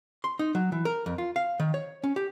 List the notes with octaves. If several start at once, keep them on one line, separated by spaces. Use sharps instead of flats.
C6
D#4
F#3
E3
A#4
F2
F4
F5
D#3
C#5
C#4
G4